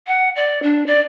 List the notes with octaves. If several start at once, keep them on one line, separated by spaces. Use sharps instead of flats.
F#5
D5
D4
D5